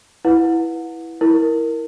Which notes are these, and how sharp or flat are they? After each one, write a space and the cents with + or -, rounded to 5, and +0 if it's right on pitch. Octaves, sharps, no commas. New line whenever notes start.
E4 +0 B4 -10 F#5 -30
E4 -10 A#4 +0